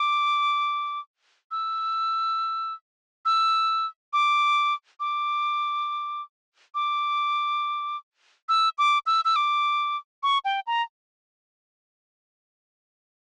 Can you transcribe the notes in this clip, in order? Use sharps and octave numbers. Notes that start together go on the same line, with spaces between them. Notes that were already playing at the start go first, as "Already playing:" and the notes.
Already playing: D6
E6
E6
D6
D6
D6
E6
D6
E6
E6
D6
C#6
G5
A#5